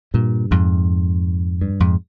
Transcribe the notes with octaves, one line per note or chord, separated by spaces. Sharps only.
G2 A#2
F2 G#2
G2
F2 G#2